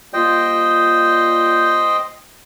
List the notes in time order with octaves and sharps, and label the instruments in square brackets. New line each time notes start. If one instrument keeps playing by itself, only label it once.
[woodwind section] G3 A#3 F4 [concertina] C5 D#5 G5